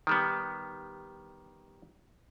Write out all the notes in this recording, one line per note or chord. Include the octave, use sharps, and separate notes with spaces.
D#3 G3 B3